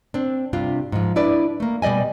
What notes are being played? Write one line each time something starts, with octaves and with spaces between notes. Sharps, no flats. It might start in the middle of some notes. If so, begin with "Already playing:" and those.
C4 D4
G2 C3 D4 F4
G#2 F3
D4 E4 B4 D5
A3 A#3
B2 G3 D5 D#5 G#5